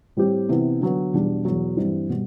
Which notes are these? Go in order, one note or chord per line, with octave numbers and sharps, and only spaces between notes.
A2 G3 C4 G4
C3 E3 B3 E4
D3 F#3 B3
E2 B2 G3 D4
E2 B2 F#3
G2 E3 G3 C4
B2 G3